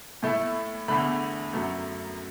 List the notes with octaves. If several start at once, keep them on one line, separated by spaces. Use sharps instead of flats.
A2 A3 E4
E2 D3 A3 B5
F#2 F#3 A3